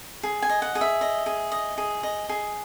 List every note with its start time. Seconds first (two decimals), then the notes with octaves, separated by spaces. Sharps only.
0.23 G#4
0.42 G#5
0.49 D#5
0.62 F#5
0.75 G#4
0.81 E5
1.01 D#5
1.26 G#4
1.52 D#5
1.78 G#4
2.03 D#5
2.29 G#4